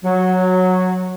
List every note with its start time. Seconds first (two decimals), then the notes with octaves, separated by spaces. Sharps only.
0.04 F#3